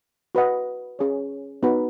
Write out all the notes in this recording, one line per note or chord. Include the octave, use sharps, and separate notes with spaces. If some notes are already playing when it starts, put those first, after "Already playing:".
F#4 B4 D#5 F#5
C#4 G#4 C#5
B3 D#4 F#4 B4